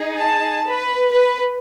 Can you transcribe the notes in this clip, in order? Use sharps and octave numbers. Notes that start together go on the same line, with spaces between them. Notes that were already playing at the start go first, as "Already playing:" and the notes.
Already playing: D#4 G#4
A5
B4
B4